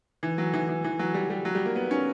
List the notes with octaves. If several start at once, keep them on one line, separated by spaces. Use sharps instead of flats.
E3
F#3
E3
E3
E3
F#3
G3
G3
F#3
G3
A#3
B3
C#4